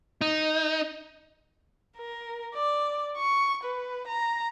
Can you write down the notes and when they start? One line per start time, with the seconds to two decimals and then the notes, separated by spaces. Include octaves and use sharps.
0.21 D#4
1.97 A#4
2.55 D5
3.17 C#6
3.64 B4
4.08 A#5